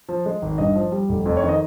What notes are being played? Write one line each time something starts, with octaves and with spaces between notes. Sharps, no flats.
F3
G#3
G#1
G2 D#5
F3
G3
F1
F2
C#5
D#3
D#5